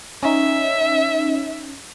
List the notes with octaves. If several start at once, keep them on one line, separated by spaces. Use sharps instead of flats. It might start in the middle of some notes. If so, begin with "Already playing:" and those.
C#4 D#4 E5